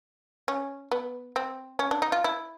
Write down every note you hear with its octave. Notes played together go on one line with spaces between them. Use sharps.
C#4
B3
C4
C#4
D4
D#4
F4
E4